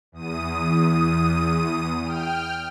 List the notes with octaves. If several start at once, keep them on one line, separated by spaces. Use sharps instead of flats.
E2 D#6 D#7
G5 F6